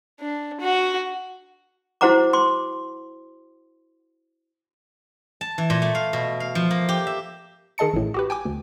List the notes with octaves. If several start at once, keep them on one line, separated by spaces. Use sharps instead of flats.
D4
F#4
E4 F#4 C5 F#5 A#5 D6
C6 D6
A5
E3
A#2
A3
F5
B2
F5
F3
A#3
G4
E5
D#3 G#4 D#5 A5 C#7
A1 A2
F#4 G4 B4
G5 G#5 D6
D2